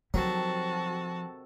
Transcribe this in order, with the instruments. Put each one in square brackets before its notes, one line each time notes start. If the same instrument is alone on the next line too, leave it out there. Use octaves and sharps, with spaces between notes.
[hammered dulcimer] C3 D#3 A4 [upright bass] F3 [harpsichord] F#3 [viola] F#4 A5